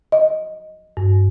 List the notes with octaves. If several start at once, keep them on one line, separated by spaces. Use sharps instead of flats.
D#5
G2